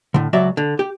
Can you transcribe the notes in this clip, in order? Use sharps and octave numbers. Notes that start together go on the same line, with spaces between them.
A2 D3
C#2 F#3 F#4 D5 E5
D3
G4